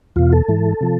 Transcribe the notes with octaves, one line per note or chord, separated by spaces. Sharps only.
E2 B2 F4
A4
G#2 E3
C3 F3